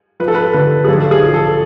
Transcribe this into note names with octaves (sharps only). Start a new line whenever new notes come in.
F3 B4
A4
B4
D3 B4
G#4
B1 A4
G#4
F3
A4